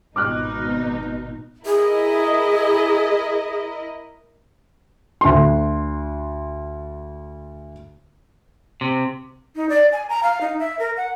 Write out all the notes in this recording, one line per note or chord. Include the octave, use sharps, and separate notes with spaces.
G#1 B2 D#4 D6 F6 F#6
E4 G#4 A#4 D#5
D2 C6
C3
D#4
D5
G#5
A#5
F5
D#4
E5
A#4
F#5